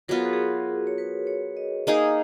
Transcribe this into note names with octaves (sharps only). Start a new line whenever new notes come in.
F#3 B3 F4 A#4
G#4
F#4
G#4
C#5
B4
C#5
D#5
A#3 D#4 G#4 F5